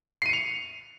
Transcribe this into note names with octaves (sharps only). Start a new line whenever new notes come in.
C7 C#7 D#7 F7